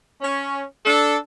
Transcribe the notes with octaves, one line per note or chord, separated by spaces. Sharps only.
C#4
D4 A4